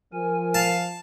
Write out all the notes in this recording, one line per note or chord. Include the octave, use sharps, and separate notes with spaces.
F3 A#4 G#5
F5 A5